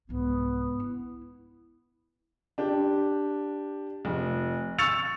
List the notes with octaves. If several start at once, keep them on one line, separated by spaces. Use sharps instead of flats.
C2 G#2 B3
E4
D4 G4
F1
C#6 E6 A6 C#7 F7